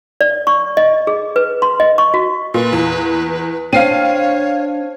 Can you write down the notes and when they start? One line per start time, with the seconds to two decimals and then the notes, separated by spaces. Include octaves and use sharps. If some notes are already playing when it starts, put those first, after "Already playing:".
0.21 D5
0.47 C#6
0.77 D#5
1.07 G#4
1.36 B4
1.62 C6
1.80 D#5
1.98 C#6
2.14 F#4
2.54 A#2 B4
2.73 E2
3.73 D4 C5 C#5 F5 G5 C7 D#7